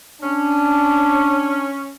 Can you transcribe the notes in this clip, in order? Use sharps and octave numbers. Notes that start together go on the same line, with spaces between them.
C#4 D4